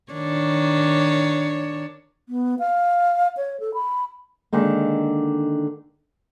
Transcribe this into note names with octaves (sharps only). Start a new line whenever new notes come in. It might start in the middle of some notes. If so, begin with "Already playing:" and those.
D#3 D4 C#5
B3
F5
C#5
A4
B5
D3 D#3 G#3 A#3